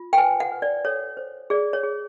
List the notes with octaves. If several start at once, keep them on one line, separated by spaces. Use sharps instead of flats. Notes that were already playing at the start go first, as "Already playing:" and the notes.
Already playing: F4
G5
B4 G#5
F#5
B4
D5
A4 C#5
C5
G#4 D5
C#5
G#4